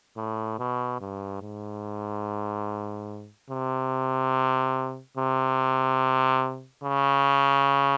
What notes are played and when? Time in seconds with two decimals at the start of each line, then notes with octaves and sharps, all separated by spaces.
0.17 A2
0.59 B2
1.01 G2
1.42 G#2
3.50 C3
5.17 C3
6.84 C#3